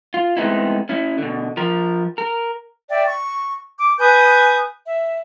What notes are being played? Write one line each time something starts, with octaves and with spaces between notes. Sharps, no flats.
F4
G#3 A3 B3 C4 D#4 E4
C#4 E4
B2 D3
F3 A#4
A#4
D5 E5 G5
C#6
D6
B4 G#5 D#6 G6
E5